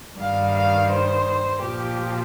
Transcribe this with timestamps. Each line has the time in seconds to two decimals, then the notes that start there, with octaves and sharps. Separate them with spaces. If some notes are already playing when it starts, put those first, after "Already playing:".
0.19 G2 D#3 G3 F5
0.55 F5
0.90 C5
1.62 A#2 F3 G4